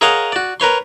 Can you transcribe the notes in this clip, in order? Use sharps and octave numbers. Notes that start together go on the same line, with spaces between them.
G#4 A#4 C#5 D#5 F5 F#5
F#4 D5
A#4 B4 C#5 C6